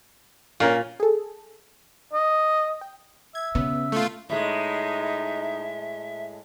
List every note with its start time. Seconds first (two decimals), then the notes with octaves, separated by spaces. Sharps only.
0.60 A#2 C#4 A#4 F5
1.00 G#4 A4
2.13 D#5
2.81 G5
3.35 E5 G#6
3.55 C#3 B3
3.92 A3 F4
4.30 A2 G#3 D#4 E5